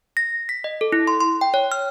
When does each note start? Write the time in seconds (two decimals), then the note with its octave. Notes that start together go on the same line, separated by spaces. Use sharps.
0.17 A#6
0.49 B6
0.64 D#5
0.81 A4
0.92 E4
1.07 C6
1.20 C6
1.41 G5
1.54 C#5
1.72 F6